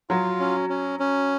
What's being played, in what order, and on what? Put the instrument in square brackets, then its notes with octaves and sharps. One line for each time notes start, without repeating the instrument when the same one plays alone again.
[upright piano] F#3 [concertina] F4
[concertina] C#4
C#4
C#4